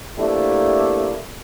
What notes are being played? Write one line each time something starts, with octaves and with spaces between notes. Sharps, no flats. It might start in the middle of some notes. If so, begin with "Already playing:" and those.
A3 A#3 C4 D4 E4 G4